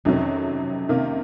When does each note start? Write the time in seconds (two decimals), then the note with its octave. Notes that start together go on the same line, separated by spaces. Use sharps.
0.05 F2 C3 D#3 F#3 C#4
0.89 C3 D#3 A#3